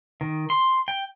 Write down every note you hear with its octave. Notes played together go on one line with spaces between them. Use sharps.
D#3
C6
G5